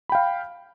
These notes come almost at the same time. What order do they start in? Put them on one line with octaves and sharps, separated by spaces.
B5 G5 F5